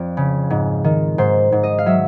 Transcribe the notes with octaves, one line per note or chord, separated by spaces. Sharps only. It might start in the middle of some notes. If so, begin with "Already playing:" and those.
Already playing: F2 D5
C#3
G#2
D#3
G#2 C5
G#2
D#5
F5
F#3 E5